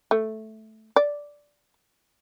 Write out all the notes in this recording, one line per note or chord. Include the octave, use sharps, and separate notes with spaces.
A3
D5